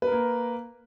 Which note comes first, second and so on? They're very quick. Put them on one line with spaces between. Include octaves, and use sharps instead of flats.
B4 A#4 A#3